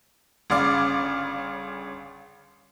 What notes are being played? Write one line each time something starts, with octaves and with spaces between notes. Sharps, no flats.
G1 C#3 D5 F5 D6